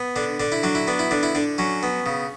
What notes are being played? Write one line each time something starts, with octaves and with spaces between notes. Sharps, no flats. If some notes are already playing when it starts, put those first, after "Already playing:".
Already playing: B3
D3 D4
D3 D4
E4
F#3 D4
E4
B3 D4
E4
D3 D4
E4
D3 D4
F#3 C#4
B3
C#3